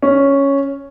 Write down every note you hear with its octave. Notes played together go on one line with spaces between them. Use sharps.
C#4